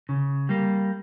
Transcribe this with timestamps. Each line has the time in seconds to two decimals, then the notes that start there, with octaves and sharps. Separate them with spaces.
0.09 C#3
0.49 G3 A#3